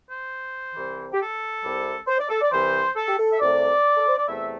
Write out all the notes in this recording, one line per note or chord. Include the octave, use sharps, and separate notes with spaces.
C5
C2 C3 E3
G4
A4
C2 C3 G3
C5
D5
A4
D5
C2 C3 E3 C5
A4
G4
A4
E5
C2 C3 A3 D5
A4
C5
D5
E2 C3 A3 E5